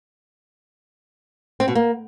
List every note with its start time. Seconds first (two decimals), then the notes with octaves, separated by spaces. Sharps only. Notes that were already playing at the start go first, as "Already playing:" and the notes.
1.60 C4
1.68 B2
1.75 A#3